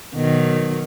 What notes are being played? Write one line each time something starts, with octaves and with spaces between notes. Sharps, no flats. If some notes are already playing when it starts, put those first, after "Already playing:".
B2 D#3 F#3